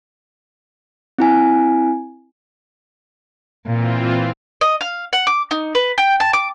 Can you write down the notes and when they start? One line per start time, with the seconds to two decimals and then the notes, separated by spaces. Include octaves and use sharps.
1.18 C4 E4 G#5
3.66 A#2 E3 C4 F4
4.61 D#5
4.81 F5
5.13 F#5
5.27 D6
5.51 D#4
5.75 B4
5.98 G5
6.20 A5
6.33 D6